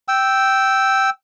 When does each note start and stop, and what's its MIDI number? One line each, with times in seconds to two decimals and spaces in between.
0.08 1.10 79
0.08 1.10 88